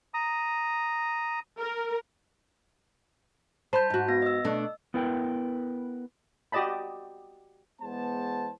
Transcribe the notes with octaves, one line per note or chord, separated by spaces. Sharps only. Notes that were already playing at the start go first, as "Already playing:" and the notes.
A#5 D#6
A#4
C5 A5 B5 G6
G#2 F#4
B3 A#6
D#5 E6
B2 A3 D4
B3 E4 A#4 B4 G5
F#4 G4 D5 D#5 A5 B5
E2 G#3 B3 C5 A5